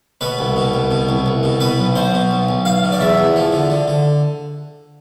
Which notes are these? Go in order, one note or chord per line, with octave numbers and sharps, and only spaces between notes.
B2 B4
C2
B2
C2
B2
C2
C2
B2
B2 B4
B1
B2 C5
B2
B1
B1
B1 F5
B2
D5
E2 E5
E2
F3
D3
D3
D3